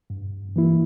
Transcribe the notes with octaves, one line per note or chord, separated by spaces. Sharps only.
G2
E3 A#3 E4